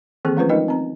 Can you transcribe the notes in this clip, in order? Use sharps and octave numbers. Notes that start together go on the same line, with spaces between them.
D#3 E3 A#3 C4 G#4 A4
F3 A3 C#4 F4 B4 C5
G#3 D#4 A#4 B4 D#5 G5
C4 A#5